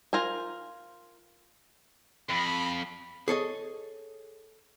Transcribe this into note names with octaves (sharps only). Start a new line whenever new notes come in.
F4 A#4 C5 G#5
F2 B5
G#4 A4 C#5 D#5